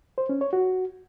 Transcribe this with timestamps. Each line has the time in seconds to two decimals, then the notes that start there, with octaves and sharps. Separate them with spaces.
0.18 C5
0.29 C#4
0.41 C#5
0.53 F#4